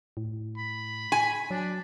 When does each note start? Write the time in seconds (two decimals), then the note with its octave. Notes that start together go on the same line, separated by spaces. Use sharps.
0.17 A2
0.58 B5
1.12 G#5
1.51 F#3 D4